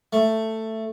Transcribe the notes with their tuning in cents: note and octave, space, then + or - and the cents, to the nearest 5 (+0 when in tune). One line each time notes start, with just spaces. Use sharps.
A3 +10